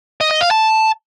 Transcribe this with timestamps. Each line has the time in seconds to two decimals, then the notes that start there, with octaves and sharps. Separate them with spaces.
0.21 D#5
0.31 D#5
0.41 F5
0.51 A5